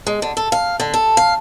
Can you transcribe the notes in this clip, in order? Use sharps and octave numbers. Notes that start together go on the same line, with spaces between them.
G#3
D3
A4
F5
D3
A4
F5